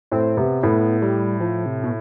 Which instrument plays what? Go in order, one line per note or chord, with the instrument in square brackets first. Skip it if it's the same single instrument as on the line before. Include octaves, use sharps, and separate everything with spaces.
[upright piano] A2 [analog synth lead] C4
[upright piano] C3 [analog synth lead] B3
[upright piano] A2 [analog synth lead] B3
[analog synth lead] G3
F3
C3
B2